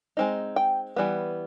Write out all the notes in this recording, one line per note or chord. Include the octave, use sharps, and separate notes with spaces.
G#3 C4 D#4
G5
E3 G3 B3